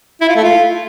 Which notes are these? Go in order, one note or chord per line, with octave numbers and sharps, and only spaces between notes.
E4
F4
A3
F4